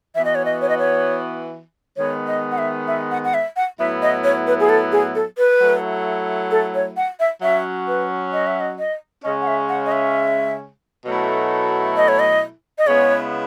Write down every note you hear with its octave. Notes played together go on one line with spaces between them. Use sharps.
E3 B3 F#4 E5
D#5
C#5
D#5
C#5
D#5
C#5
D#3 G#3 B3 C#5
D#5
F#5
E5
E5
F#5
F#5
E5
F#5
A2 F#3 B3 E4 E5
D#5
C#5
B4
G#4
A4
G#4
A4
B4
F#3 A3 E4
A4
C#5
F#5
E5
F#3 C#4 F#4 E5
B4
D#5
E5
D#5
D#5
C#3 G#3 C#4 D#5
F#5
E5
F#5
D#5
E5
B2 F#3 A3 E4
D#5
C#5
D#5
D#5
C#3 G#3 B3 E4 C#5